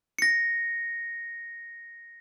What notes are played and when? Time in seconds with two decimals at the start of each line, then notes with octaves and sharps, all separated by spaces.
0.19 A#6 C#7